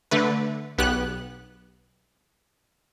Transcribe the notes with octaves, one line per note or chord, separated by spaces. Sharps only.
D3 A3 B4
B1 B3 G4 F#6